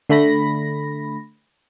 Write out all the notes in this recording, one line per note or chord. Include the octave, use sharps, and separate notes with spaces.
D3 A3 B5 A#6